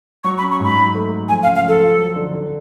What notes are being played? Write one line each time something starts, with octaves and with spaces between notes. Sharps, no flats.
F#3 C#6
B5
C#4
C#6
G#2 B5
F#3
A3
A3
F3 G#5
F5
C#2
F5
F3 A4
F4
F#3
D3
D3